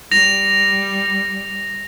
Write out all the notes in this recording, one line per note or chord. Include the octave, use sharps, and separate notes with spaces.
G3 A#6 F7